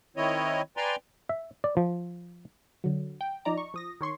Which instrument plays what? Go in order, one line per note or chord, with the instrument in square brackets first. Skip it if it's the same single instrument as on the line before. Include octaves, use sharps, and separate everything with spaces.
[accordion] D#3 C4 E4 C#5 D#5
B4 D5 G5 G#5 A#5 C6
[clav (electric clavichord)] E5
D5
F3
[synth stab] D3 F#3
G5
F3 D#4 D5 A#5
C#6
F3 D#6 A#6
D#3 C#5 C6 C#6